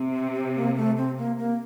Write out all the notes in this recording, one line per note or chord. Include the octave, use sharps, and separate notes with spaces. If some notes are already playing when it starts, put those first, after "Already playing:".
Already playing: C3
C4
C4
A#3
A3
C4
A#3
A#3